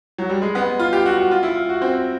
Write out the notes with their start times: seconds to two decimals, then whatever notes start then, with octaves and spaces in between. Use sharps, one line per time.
0.18 F#3
0.30 G3
0.42 G#3
0.55 B3
0.79 F4
0.93 G4
1.06 F#4
1.18 F#4
1.31 F4
1.43 E4
1.56 F4
1.69 F#4
1.82 C4